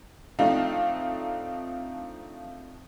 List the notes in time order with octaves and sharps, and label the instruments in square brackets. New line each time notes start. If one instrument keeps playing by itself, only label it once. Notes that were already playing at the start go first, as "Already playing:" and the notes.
[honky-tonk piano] F3 A3 C4 D4 D#4 F4